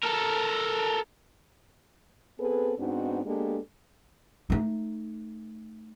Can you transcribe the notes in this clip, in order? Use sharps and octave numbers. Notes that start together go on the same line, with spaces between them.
A4 A#4
B3 C4 G#4 A4 B4
G#2 B3 C4 D4 D#4 F#4
G#3 A#3 B3 D4 G4 A4
A3 D#4